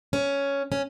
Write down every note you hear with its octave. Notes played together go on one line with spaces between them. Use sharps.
C#4
C#4